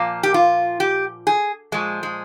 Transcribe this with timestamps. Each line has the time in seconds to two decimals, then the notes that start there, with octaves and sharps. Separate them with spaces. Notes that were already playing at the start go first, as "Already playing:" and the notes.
Already playing: A#2 F3 A#3
0.23 G4
0.34 F4
0.80 G4
1.27 G#4
1.72 A#2 F3 G#3
2.03 G#3